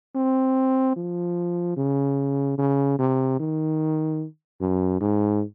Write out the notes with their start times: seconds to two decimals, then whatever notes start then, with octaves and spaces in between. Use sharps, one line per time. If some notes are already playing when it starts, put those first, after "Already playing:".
0.15 C4
0.96 F3
1.77 C#3
2.58 C#3
2.99 C3
3.39 D#3
4.61 F#2
5.00 G#2